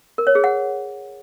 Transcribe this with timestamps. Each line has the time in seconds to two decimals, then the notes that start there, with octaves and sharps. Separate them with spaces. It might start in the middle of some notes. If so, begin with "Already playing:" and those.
0.18 A#4
0.27 C#5
0.35 G#4
0.44 F#5